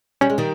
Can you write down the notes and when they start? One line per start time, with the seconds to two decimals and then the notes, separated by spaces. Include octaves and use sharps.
0.21 G3 C#4
0.30 G#3
0.38 D#3 G3